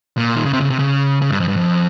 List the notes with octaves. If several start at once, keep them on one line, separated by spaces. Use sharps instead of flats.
A#2
D#3
C#3
C3
C#3
C3
C#3
C#3
G2
F2
G2
F2